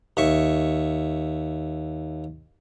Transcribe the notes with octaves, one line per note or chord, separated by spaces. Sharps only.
D#2 E5 C#6